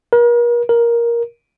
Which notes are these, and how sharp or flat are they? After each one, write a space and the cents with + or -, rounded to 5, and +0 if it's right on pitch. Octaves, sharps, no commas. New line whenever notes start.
A#4 +40
A#4 +10